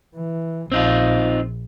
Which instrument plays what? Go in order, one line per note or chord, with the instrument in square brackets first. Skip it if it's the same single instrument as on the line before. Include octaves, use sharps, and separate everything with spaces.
[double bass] E3
[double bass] A#1 [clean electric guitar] C4 D#4 F4